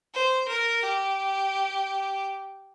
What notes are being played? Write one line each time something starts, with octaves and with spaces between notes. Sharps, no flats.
C5
A#4
G4